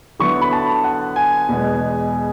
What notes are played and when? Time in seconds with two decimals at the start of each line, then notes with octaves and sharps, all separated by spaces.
0.20 D3 F#3 B3 E4 C#6
0.41 B5
0.53 A5
0.84 F#5
1.16 G#5
1.48 E2 B2 G#3 B3